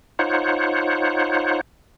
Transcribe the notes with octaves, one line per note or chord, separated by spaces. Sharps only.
D#4 F4 C5 C#5 F#5